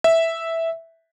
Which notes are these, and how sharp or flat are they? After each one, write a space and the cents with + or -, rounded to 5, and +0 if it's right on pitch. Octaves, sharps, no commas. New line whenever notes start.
E5 -5